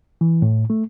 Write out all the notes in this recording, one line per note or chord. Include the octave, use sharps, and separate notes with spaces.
E3
A2
A3